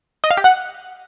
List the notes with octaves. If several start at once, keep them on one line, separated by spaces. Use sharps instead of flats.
D#5
F5
G4
F#5